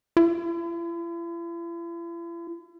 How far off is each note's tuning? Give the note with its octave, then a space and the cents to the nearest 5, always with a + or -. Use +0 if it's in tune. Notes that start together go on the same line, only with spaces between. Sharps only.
E4 +45